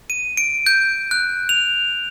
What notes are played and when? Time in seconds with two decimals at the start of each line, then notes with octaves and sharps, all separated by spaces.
0.10 D#7
0.37 D7
0.66 G6
1.11 F#6
1.49 F7